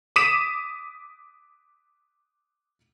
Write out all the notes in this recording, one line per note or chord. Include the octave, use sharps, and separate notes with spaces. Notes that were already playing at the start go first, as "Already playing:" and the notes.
D6 D#6 B6 D#7 E7